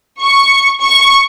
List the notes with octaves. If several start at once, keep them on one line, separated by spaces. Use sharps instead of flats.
C#6
C#6